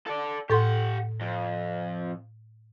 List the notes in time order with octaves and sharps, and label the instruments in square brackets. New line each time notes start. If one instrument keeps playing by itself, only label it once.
[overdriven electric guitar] A4 D5
[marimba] A2 A4 C6 [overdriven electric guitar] G4 F#5
[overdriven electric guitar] F2